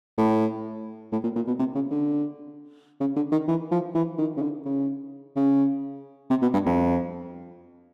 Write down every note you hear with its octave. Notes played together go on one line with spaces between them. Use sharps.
A2
A2
A#2
A#2
B2
C3
C#3
D3
C#3
D3
D#3
E3
F3
E3
D#3
C#3
D3
C#3
C#3
C3
B2
G2
F2